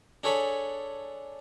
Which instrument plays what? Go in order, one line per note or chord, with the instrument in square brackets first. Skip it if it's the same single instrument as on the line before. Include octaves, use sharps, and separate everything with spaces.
[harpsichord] D4 G#4 A4 C#5 G#5 B5